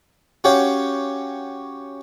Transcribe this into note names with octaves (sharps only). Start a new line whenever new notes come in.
C#4 F#4 G4 C#5 F5